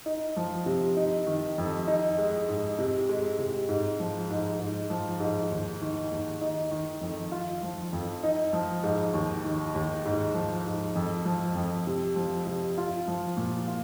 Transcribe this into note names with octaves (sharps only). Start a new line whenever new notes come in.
D#4
F3
C3
D#4
D#3
F2
D#4
G#3
G#2
C3
G#3
C3
G#2
F3
G#2
G#2
F3
G#2
D#2
D#3
D#2
D#4
D#3
F2
F4
F3
F2
D#4
F3
G#2
D#2
D#3
D#2
G#2
F3
G#2
F2
F3
F2
C3
F3
C3
F4
F3
A#2
F4